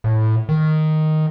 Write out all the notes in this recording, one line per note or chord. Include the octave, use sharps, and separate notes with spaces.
A2
D#3